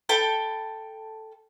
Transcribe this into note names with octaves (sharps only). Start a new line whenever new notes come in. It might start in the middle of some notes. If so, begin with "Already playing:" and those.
A4 G5 B5